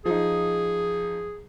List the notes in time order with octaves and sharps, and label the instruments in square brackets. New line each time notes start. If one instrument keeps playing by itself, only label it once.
[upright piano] F3 D#4 [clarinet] G#4